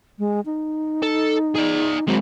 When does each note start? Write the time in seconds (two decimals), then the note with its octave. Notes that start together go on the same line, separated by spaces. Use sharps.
0.19 G#3
0.46 D#4
1.02 A4
1.56 G#4 D5
2.08 F#3 G#3 C4